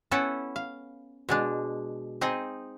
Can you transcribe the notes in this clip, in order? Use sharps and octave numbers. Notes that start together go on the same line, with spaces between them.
B3 C#4 E4 A4 E5 F#5
F5
B2 G#3 D4
C4 D#4 G#4 D#5